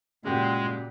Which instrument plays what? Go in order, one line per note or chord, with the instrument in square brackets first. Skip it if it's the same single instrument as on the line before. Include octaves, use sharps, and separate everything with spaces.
[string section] A#2 [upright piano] C#3 F#4 G4 [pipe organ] G#3